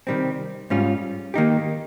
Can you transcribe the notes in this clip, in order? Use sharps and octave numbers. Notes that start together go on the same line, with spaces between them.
C3 D#3 G3 C4
G#2 G3 C#4 F4
D#3 A#3 D#4 G4